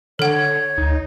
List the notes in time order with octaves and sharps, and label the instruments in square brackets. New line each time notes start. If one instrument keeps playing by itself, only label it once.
[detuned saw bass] D3 [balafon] A4 F#5 [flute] C#5
[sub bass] D2 [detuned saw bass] D#4